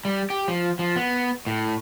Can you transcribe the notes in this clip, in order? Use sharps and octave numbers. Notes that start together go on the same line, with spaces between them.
G3
G4
F3
F3
B3
A2